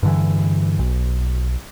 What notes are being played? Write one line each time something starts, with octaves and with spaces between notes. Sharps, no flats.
G2 D3 E3
B1